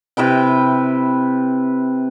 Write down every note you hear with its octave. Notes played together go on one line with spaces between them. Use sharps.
C3 E4 B4 G5